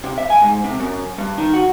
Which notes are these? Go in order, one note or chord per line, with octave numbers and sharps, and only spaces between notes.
C3
E5
G#5
G#2
C3
F#2
G2
D#3
F#4